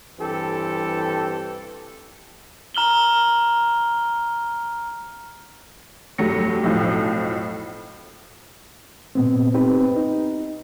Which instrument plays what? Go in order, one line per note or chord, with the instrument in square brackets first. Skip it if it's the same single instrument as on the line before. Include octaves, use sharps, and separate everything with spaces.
[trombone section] G2 E3 C4 G4 A4
[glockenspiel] A#5 F6 F#7 G7
[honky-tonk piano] F1 G2 F#3 A3 A#6 C#7
B1 F2 A2 F3
[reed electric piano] A#2 B3 C4
C4 D#4 G4 B4
D#4